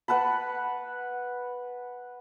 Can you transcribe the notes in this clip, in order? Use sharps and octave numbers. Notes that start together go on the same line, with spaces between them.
B4 F#5 A5 B5